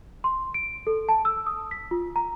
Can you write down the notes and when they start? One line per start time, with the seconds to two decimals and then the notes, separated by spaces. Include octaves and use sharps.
0.24 C6
0.54 D7
0.87 A4
1.09 A5
1.25 E6
1.47 D#6
1.71 B6
1.91 F4
2.16 A#5